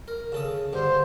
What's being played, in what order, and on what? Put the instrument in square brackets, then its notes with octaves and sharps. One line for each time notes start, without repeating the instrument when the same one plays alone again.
[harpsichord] A#4
C#3 A4 D#6
[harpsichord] G2 D3 [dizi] C5